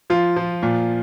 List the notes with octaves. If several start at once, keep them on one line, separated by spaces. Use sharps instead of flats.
F3 F4
F3
A#2